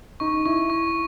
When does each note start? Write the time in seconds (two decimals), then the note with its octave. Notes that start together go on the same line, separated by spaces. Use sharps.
0.20 D#4 C#6
0.45 E4 C#6
0.70 C#6